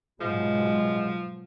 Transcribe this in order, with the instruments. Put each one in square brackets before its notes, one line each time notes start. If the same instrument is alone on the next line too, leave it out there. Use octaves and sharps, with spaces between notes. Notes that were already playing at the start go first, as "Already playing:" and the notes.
[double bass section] G#2 B2 F#3 [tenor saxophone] F3 [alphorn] G#3